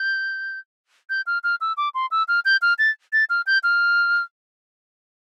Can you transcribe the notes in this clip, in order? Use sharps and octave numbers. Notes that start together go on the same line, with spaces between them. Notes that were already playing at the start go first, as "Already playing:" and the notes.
Already playing: G6
G6
F6
F6
E6
D6
C6
E6
F6
G6
F6
A6
A6
F6
G6
F6